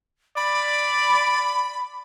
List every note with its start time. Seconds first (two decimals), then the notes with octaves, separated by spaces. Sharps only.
0.37 D5 B5